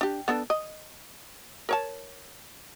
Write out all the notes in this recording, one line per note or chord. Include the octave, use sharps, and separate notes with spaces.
D4 G4
B3 D4 A4
D#5
A#4 C#5 A5